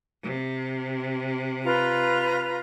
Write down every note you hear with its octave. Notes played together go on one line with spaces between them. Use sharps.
C3
F4 B4 A#5